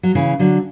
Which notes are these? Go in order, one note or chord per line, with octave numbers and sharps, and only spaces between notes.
F#3
C#3 E3
D3 F#3